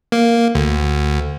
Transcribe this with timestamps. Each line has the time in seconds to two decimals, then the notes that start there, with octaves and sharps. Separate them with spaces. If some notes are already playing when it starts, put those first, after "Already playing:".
0.12 A#3
0.55 D2